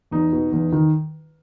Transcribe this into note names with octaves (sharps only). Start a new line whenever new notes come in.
E2 D#4
B2
E2
D#3